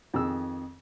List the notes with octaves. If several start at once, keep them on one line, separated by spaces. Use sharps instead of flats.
F2 D#3 G#4 E6